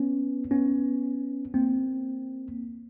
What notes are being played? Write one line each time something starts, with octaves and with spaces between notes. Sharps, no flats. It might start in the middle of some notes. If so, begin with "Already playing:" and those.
Already playing: B3 C#4
B3 C#4
A#3 C4